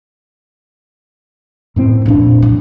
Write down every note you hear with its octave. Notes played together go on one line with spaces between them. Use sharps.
F#2 A2 C4
F1 A#2 D4 E4
F#3